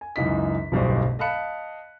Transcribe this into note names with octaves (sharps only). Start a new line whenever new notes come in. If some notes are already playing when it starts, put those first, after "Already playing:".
G#5
C#2 F#2 E3 D#4 D#5 B6
D1 B1 G2 B2 C5 D#5
D#5 F5 A5 B5 F#6 C#7